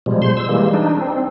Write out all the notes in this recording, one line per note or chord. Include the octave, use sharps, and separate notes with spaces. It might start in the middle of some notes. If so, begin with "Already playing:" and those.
B2 F3 G3 G#3
C5 C6
E6
E3 G3 G#3 A#3
D4 D#4
C4